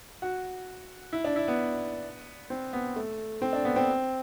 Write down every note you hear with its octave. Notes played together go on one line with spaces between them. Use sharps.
F#4
E4
D4
E4
B3
C4
B3
A3
C4
D4
B3
C4